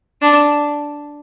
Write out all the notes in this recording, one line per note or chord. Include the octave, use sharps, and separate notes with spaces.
D4